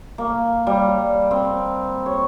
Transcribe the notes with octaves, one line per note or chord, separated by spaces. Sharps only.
A#3
G3
C4
C#5